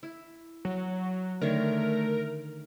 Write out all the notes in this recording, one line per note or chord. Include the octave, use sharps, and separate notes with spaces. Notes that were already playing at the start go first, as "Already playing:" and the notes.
E4
F#3
D3 D#3 A3 A#4 C#5